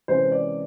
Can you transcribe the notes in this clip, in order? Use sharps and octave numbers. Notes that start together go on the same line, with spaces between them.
C3 E3 G#3 C#4 C5
D5